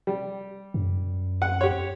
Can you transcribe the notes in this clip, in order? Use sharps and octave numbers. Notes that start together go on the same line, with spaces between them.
G3
F#2
F#5
G4 C#5